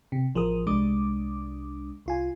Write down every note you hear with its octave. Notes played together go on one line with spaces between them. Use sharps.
C3
A1 F3 G#4 A#4 D#6
C2 G#3 D4 D6 D#6
C2 F4 G#5